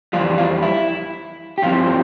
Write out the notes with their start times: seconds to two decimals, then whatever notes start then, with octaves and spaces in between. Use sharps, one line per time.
0.13 F2 E3 G3 F4
0.38 F4
0.63 E4
1.58 G4
1.62 G2 F3 C4 E4 F4
1.87 G4